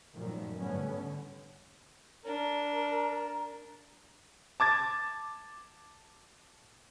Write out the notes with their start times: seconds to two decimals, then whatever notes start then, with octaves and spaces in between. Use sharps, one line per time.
0.15 F#2 A#2 D#3 F3 G3 A3
0.58 G#2 D3 G3 A3 B3 C#4
0.90 D3
2.25 D4 A#4 A#5
4.60 A5 D6 G#6 A6